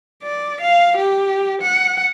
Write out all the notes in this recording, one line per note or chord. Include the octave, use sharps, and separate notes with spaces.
D5
F5
G4
F#5